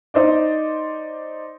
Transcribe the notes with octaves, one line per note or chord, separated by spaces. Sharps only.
D#4 C5 D5